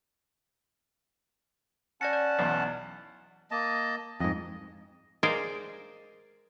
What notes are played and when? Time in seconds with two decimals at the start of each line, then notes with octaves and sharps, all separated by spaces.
2.01 C#4 D5 F#5 A5 A#6 C#7
2.13 D5
2.39 B1 E2
3.51 A#3 D#5 A5
4.20 F2 G#2 D#5
5.23 G#3 G#4 A#4 C5 D5 F5